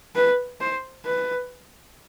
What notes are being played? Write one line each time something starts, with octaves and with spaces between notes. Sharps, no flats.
B4
C5
B4